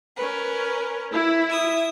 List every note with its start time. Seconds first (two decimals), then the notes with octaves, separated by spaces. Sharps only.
0.17 C#4 A#4 B4
1.11 E4
1.49 E5 D#6